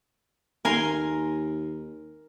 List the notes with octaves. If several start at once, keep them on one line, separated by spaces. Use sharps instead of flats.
D#2 A#4 G#5 C6